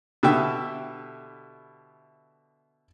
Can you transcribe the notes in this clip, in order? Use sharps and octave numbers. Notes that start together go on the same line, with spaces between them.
B2 D3 E4 G4 E5 G5